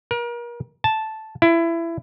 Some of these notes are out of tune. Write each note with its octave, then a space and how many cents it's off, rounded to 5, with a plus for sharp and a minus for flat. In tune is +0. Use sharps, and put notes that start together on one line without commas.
A#4 +35
A5 -5
E4 +20